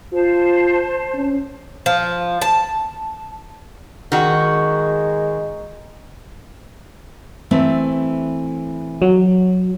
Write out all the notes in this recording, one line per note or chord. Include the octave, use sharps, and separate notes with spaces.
F4 C5 A5
C#4
F3
A5
D#3 G#3 F#4
E3 A3 C4
F#3